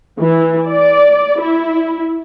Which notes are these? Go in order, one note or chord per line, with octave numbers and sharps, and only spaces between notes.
E3
D5
E4